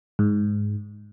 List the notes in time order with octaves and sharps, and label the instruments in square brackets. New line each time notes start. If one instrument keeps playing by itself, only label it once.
[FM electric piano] G#2